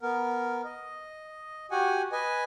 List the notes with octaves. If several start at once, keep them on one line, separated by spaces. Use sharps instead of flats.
B3 A#4
D#5
F#4 G4 F#5 G#5
B4 D#5 G#5